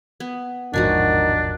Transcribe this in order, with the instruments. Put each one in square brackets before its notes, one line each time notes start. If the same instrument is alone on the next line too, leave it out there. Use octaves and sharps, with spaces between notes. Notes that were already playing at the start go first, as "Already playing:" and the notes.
[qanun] B3
[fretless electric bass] E1 A1 G#2 [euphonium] D#3 [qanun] F3 F#4 G#5 [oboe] D4